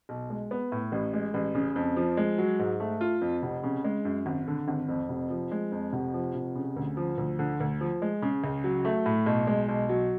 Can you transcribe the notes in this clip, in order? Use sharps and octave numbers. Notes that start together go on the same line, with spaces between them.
B1
G#3
B3
A2
A1
G#3
A1
C#3
F2
F3
G#3
F#3
G#2
A3
F4
F2
F1
C#3
G#3
F#2
G#1
D3
G#1
F2
F1
F3
G#3
F2
F1
F3
F1
C#3
D2
F3
D2
D3
D2
F3
G#3
C#3
C#2
F#3
A3
A2
B1
G#3
B1
F#3